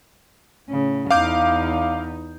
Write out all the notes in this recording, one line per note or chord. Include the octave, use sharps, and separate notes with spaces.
A2 C#3
E2 D#4 F5 D6 G6